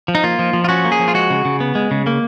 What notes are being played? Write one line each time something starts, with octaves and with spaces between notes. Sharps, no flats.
F3
D#4
A#3 F4
F3
F3
F4
C#4 F#4
A#3
G#4
F3
F4
G#3 F#4
C#3
C#3
B3
G#3
C#3
A#3